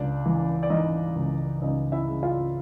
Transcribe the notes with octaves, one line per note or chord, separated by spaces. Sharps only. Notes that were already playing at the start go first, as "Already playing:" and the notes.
Already playing: C#2 D4 D5
E3
D5
E3 D#4 D#5
C#2
C#2 D#4 D#5
E4 E5
C#3
F4 F5